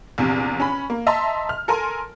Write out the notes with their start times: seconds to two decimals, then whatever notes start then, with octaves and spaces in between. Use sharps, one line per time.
0.18 A#1 E2 C3
0.60 C#4 B5
0.90 A#3
1.06 D#5 E5 A5 A#5 C6
1.49 F6
1.68 A4 A#4 G#5 A#5 C6